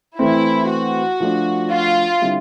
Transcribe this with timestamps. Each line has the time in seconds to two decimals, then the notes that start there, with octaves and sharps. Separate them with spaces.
0.18 E3 A3 C4 E4
0.70 F#4
1.20 F3 A3 D4
1.71 F4
2.22 D3 G3 C4 E4